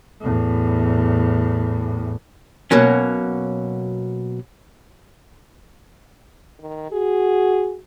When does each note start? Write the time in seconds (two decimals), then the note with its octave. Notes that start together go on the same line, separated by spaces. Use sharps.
0.21 E2 A2
2.71 B2 F#3 A#3 C#4
6.61 D#3
6.92 F#4 G#4